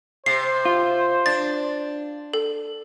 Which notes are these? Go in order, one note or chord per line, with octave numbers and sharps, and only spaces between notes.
C3 C5 C7
F4
D4 A6
A4